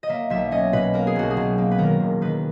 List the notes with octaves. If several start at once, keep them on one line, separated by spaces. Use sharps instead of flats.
D#5
A#3 E5
B1 E5
C#4 D#5
B2 B4
A#3 A#4
G#4
B1 F#4
G#4
B1
A#3
B4
D#3 A#4
E1
D#3 B4